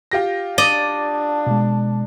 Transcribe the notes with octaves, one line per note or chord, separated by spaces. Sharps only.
F4 G4 A#6
D4 D5 D#5
B2 G#3